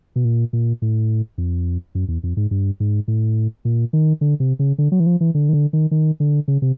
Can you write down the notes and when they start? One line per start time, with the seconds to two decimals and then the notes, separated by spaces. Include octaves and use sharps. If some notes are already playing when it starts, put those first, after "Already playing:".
0.16 B2
0.25 A#2
0.53 A#2
0.82 A2
1.38 F2
1.95 F#2
2.08 E2
2.23 F2
2.37 G#2
2.51 G2
2.80 G#2
3.08 A2
3.65 A#2
3.93 D#3
4.21 D3
4.40 C3
4.59 C#3
4.78 D3
4.92 F#3
5.00 E3
5.06 F3
5.21 E3
5.34 D3
5.49 D#3
5.53 D3
5.73 D#3
5.91 D#3
6.20 D3
6.48 C#3
6.62 C3